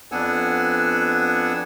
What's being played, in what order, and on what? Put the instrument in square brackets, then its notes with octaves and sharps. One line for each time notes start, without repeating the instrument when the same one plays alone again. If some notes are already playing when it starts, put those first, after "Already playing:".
[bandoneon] F2 B3 D4 F#5 G#5 E6